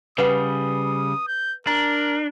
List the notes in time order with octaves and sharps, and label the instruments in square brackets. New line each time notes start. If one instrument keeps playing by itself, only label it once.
[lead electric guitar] C#3 G3 [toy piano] B4 F#5 [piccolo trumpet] D#6
[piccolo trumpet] G6
[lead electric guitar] D4 [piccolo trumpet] A#4 [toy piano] A#5